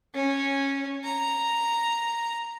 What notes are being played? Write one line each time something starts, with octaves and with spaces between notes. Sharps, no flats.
C#4
A#5